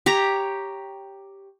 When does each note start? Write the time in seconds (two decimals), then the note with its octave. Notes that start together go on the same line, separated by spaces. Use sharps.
0.06 G4 C#5 A#5